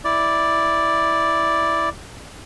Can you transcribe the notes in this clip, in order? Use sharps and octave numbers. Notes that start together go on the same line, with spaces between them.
E4 D5